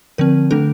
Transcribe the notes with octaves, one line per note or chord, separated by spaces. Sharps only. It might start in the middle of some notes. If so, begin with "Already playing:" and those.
D3 F3 C4 A#4
D3 A3 D4 A4